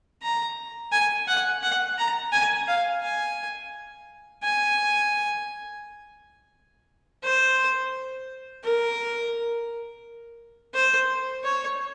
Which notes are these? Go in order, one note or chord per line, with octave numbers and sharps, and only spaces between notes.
A#5
G#5
F#5
F#5
A#5
G#5
F5
G#5
G#5
C5
A#4
C5
C#5